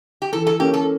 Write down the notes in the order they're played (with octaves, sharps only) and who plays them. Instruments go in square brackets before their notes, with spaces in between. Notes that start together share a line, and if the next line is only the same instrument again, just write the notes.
[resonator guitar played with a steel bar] G4
[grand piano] E3 [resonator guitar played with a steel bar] A4
[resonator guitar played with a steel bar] A4
[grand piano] A#3 C#4 [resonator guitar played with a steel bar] G4
[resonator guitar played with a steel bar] A4